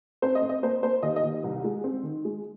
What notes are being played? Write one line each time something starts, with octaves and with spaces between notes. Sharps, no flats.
C4 C5
D#5
C4
D#5
A#3 C5
A#3 C5
D#2 D#5
D#5
D#2
C2
G#3
C4
D#3
G#3